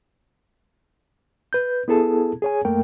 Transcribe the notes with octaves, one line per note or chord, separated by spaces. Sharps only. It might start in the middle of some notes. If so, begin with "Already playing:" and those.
B4 G6
B3 E4 G#4 A4 A5
G#4 C#5 G#5
F#2 A3 A#3 A#4 G5